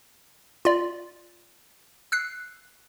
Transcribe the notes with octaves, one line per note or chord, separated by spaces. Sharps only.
F4 D5
E6 F#6 C7